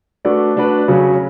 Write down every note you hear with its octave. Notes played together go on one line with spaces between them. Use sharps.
A3 D4 F#4 B4 D5
A3 D4 F#4 B4 D5
C#3 F#3 C#4